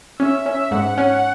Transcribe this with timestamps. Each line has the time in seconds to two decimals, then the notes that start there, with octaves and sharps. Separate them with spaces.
0.20 C#4 E5
0.46 C#4
0.71 G#2 F#5
0.98 C#4